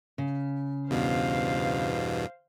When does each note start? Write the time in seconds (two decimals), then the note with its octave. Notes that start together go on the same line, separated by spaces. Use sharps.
0.18 C#3
0.90 E2 G2 B2 C5 F5